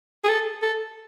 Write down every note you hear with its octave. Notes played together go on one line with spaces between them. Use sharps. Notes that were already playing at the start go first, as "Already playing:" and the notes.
G#4
A4
A4